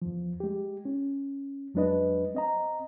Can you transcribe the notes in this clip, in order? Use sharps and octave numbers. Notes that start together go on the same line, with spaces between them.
E2 F3
G#3 G4
C#4
F2 F#3 G#3 D4 B4 D#5
C4 D#5 A#5